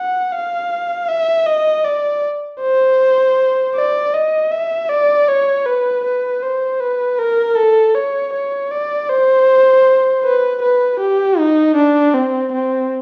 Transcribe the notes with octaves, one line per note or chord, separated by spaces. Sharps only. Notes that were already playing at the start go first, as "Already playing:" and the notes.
Already playing: F#5
F5
E5
D#5
D5
C5
D5
D#5
E5
D5
C#5
B4
B4
C5
B4
A#4
A4
C#5
C#5
D5
C5
B4
B4
G4
D#4
D4
C4
C4